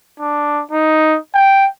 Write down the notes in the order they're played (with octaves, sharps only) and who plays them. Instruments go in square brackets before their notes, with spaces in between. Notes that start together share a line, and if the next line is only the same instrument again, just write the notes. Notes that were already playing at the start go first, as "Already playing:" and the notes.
[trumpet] D4
D#4
G5